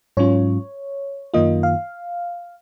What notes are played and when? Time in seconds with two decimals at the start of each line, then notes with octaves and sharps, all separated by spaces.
0.17 G#2 F#3 C#4 F4 C#5
1.34 F#2 D#3 A#3 F4 D#5
1.63 F5